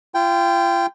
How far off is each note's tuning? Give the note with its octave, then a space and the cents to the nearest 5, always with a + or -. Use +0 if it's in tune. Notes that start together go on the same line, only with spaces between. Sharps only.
F4 -35 G5 +0